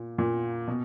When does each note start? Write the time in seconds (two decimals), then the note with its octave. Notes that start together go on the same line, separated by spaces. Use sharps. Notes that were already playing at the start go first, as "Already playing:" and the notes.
Already playing: A#2
0.18 A#2
0.68 B2